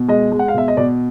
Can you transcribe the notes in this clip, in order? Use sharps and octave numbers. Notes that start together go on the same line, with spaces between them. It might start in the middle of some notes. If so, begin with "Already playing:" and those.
Already playing: B2
G#3 D#5
G#3
F#5
F5
B2 E5
D#5
B2 D5